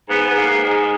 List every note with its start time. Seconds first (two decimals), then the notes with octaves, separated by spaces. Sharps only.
0.09 G#2 B3
0.28 G#2 B3
0.36 A#3
0.49 G#2
0.63 G#3
0.69 G#2